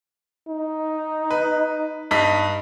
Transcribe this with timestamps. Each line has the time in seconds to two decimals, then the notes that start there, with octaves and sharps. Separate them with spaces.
0.48 D#4
1.31 B4
2.11 G2 D#4 B6